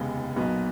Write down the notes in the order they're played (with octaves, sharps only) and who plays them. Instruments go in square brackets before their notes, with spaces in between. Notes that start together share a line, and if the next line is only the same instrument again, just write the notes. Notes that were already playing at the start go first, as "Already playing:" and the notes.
Already playing: [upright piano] F1 D#2 C#3 G#3 B3
B1 A#2 F#3 B3